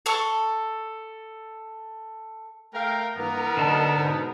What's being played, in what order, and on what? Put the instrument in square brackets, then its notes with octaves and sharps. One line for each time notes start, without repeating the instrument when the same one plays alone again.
[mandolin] A4 C#6
[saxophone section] A3 F5 [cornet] A#4 [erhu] G5
[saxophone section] G2 E3 A#3 [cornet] B3 [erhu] A#4
[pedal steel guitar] D3 A5 [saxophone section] F#3 A#3 D#4
[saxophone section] G#2 B2